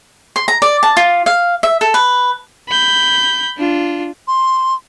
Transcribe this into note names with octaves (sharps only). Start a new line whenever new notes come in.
C6
A#5
D5
A5
F4
F5
E5
A4
B4
B5 G6
D4 F4
C6